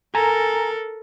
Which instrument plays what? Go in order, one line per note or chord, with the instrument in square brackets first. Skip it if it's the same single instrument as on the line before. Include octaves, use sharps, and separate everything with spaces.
[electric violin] A4 A#4 [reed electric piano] G#5 A#5